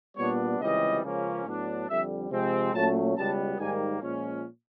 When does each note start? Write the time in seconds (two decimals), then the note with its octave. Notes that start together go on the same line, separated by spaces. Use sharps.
0.16 A#2 G3 B3 D4 C#5
0.59 C#2 C3 E3 G3 D#5
1.02 C#2 C#3 F3 A#3 C#4
1.45 A2 F#3 B3 D4
1.88 F2 D3 G3 E5
2.30 C3 F3 G#3 C4
2.73 A#2 F#3 A3 C#4 A5
3.16 C#2 B2 G3 B3 A5
3.58 G#2 D#3 G3 A#3 G#5
4.01 A#2 F3 G#3 C#4